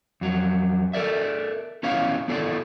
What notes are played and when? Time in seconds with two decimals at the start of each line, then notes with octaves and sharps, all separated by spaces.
0.21 F2 F#3
0.93 A4 A#4 D5 E5
1.83 B3 C#4 E4 C#5 F5
2.28 B3 E4 F4 A4 D5